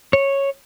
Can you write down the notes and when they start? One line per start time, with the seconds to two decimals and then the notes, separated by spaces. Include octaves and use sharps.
0.13 C#5